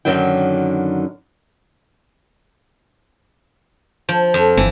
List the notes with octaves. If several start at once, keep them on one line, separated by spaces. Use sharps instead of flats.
F#2 D3 D#3 F#3 G5
F3
F2
G1 E3